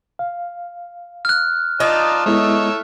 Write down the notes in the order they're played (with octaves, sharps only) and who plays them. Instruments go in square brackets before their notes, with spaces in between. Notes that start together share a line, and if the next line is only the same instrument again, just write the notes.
[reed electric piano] F5
[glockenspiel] F6 F#6
[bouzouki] D#4 [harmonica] F4 D5 A5
[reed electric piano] G#3 B3 E4 [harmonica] A4 C#5 E5